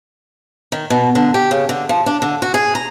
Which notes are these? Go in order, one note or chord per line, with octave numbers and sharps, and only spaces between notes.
D#3
B2
D3
G4
C#3
D3
F3
D4
D3
F#4
G#4
A#5